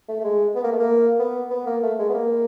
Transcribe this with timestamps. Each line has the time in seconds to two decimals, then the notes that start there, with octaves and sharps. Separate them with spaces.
0.08 A3
0.20 A3
0.24 G#3
0.55 B3
0.63 A#3
0.72 A3
0.79 A#3
1.19 B3
1.51 B3
1.66 A#3
1.83 A3
1.99 G#3
2.09 B3
2.14 A#3